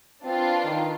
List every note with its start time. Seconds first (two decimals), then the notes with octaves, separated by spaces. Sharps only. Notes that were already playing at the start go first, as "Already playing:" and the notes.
0.24 C4 D4 F4 B4
0.64 D#3